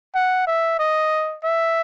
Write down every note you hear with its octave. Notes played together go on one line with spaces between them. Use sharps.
F#5
E5
D#5
E5